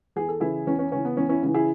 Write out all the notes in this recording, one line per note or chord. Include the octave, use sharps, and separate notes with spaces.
E2 G#4
A4
C#3 E3 E4 G#4
E2 C#4
C#4
C#3 E3 C#4
B3
E2 C#4
C#4 E4
C#3 E3
E4 G#4